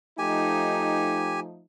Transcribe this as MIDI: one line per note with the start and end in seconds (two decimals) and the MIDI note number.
0.19 1.63 53
0.19 1.63 57
0.19 1.63 63
0.19 1.40 67
0.19 1.40 80